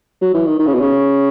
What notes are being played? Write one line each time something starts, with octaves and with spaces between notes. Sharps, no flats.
F#3
E3
D#3
D#3
C#3
B2
C#3